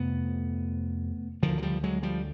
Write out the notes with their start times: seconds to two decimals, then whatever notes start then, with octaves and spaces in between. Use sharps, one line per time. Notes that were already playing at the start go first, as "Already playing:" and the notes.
Already playing: F2 C3 A3 B3
1.42 D3 D#3 F3
1.48 D2
1.58 F#3
1.62 F3 G3
1.83 F#3 G#3
2.03 F3 G3